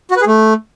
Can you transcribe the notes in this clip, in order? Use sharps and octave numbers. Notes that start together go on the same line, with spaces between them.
F#4
B4
G#4
A3